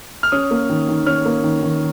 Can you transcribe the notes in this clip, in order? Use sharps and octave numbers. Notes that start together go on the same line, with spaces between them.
F6
C#4 D#6
A#3
D#3
D#3
C#4 F6
A#3
D#3
D#3